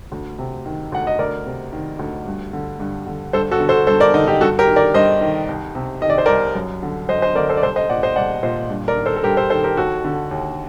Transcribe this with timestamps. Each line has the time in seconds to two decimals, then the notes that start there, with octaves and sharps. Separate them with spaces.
0.12 D2
0.39 C3
0.66 D#3
0.92 D2 F#5
1.07 D#5
1.19 D2 A#4 D5
1.46 C3
1.73 D#3
1.99 D2
2.26 G2
2.53 D3
2.80 G2
3.07 D3
3.33 G2 A4 C5
3.51 F#4 A4
3.60 D3
3.69 A4 C5
3.87 G2 A4 C5
4.00 A#4 D5
4.14 D3 D#4
4.28 D#4 G4
4.41 G2 F#4 A4
4.59 G4 A#4
4.67 D#3
4.76 A#4 D5
4.94 G2 C5 D#5
5.21 D#3
5.48 C2
5.75 C3
6.02 D#3 D#5
6.10 D5
6.18 C5
6.26 C2 A#4 D5
6.55 F#2
6.83 D3
7.09 F#2 C5 D#5
7.22 C5 D#5
7.35 D3 A#4 D5
7.49 A4 C5
7.57 D5
7.62 C2 A4 C5
7.76 C5 D#5
7.89 A#2 D5 F#5
8.03 C5 D#5
8.16 C2 D5 F#5
8.43 A#2 C5 D#5
8.70 G2
8.88 A#4 D5
8.97 D#3
9.06 A4 C5
9.16 A4
9.24 G2 G4 A#4
9.37 A4 C5
9.50 D#3 A4 C5
9.64 G4 A#4
9.77 D#2 F#4 A4
10.04 D3
10.31 D#2